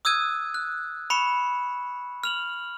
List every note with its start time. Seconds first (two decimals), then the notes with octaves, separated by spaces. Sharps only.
0.05 D#6 E6 F#6 G#6 D#7
0.54 F#6
1.10 B5 C#6 C#7 E7
2.24 F6 F7 F#7